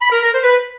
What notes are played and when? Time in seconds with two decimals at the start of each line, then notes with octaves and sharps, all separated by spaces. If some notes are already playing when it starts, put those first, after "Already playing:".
0.01 B5
0.11 A#4
0.22 A#4
0.33 C5
0.44 B4